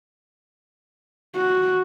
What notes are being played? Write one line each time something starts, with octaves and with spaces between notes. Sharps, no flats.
F#4